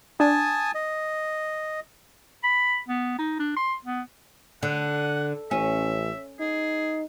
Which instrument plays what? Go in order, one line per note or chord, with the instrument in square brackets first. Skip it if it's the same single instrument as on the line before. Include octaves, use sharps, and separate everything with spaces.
[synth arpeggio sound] D4 [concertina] G#5 A5 D#6
[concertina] D#5
[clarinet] B5
B3
D#4
D4
C6
B3
[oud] D3 [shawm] F#5
[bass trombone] A1 [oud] C#4 [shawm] E5
[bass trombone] D#4 [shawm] G#4